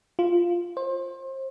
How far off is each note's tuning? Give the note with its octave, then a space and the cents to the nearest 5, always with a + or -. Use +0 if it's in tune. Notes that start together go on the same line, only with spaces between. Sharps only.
F4 +0
C5 +30